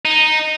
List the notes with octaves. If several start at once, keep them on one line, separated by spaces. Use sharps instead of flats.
D#4